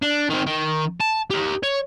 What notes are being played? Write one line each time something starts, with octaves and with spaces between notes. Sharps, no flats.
D4
D#3 C4
D#3
A5
G4 A#4
C#5